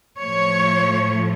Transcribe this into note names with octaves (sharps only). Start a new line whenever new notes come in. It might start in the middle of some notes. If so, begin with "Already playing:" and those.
A2 F3 A3 C#5